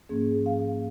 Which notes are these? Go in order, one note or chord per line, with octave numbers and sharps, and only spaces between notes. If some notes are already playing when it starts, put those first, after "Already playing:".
G#2 F3 A#3 C#4 G#4
F5